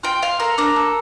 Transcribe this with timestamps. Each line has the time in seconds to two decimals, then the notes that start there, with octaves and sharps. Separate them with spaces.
0.03 F4 G5
0.22 F4 F5
0.40 A4 A#4
0.58 D4 A#4
0.76 A4